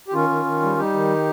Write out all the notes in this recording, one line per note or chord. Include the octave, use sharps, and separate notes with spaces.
G4
D#3 C#4 F4
D#3
D#3
G3
G3 D#4 G4
D#3